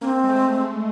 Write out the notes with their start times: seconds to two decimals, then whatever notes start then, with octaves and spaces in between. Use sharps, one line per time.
0.01 A#3 C#4
0.05 C4
0.24 G#3
0.29 A3